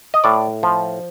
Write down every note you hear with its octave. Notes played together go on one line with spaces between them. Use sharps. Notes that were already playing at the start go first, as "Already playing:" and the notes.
D#5
A2 D5
F3